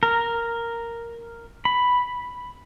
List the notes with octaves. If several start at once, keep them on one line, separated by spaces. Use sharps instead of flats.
A#4
B5